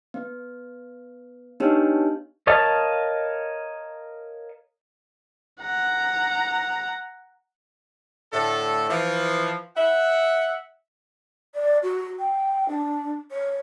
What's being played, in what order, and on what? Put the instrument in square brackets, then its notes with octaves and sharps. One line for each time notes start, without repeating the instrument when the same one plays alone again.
[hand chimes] B3
B3 D4 D#4 G4 C#5
[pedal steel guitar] A#4 C#5 D#5 F5 A5
[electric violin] F#5 A#5
[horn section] A2 D3 A3 A4
E3 F3
E5 F#5
[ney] D5
F#4
G5
D4
C#5